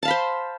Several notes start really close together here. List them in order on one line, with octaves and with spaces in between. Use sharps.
A5 F5 B5 C5